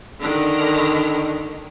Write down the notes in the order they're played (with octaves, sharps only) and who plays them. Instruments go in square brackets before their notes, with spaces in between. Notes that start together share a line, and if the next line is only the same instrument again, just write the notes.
[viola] D3 D#3